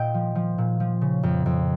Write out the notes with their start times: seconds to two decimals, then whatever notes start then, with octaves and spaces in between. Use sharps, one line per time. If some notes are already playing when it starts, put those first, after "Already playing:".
Already playing: A#2 D#5 G5
0.14 F3
0.35 F3
0.58 A#2
0.80 F3
1.01 C#3
1.23 F2
1.46 F2